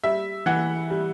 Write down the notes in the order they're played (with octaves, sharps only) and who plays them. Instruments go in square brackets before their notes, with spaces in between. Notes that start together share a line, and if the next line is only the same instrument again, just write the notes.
[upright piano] G3 E5
E3 F#5
G3